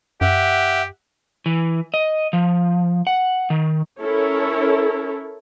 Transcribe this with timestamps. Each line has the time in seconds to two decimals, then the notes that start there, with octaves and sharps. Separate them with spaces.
0.21 F#2 G4 E5 F#5
1.46 E3
1.94 D#5
2.33 F3
3.07 F#5
3.50 D#3
4.00 C#4 E4 A4 A#4 C#5